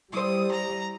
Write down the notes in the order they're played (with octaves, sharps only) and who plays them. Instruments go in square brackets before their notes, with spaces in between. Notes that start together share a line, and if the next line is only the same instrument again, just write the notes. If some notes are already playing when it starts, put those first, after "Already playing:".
[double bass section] G3 [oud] E4 C5 [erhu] D#6
[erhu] A#5